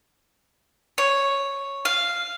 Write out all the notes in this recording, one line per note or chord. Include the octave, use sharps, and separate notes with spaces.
C#5
F5